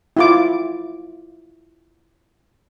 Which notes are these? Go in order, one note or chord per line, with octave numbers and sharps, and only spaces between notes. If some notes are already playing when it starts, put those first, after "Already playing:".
E4 F4 D6